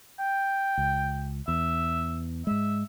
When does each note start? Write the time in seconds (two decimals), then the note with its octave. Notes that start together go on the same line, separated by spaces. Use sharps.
0.19 G5
0.78 C#2
1.48 E2 E5
2.47 G#2 G#3 E5